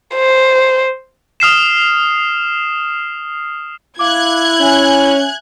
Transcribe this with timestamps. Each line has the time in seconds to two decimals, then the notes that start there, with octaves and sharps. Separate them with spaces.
0.16 C5
1.40 D#6 F6 C7 E7
3.99 E4 F5 D6 F#6 G#6
4.61 C#4 E5 G#5